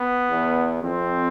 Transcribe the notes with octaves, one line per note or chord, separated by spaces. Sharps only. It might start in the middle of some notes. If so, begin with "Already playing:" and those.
Already playing: B3
E2
F2 C4